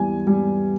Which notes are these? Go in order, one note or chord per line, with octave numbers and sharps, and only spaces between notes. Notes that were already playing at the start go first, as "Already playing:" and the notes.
Already playing: E2 E3 G3 G#5
G3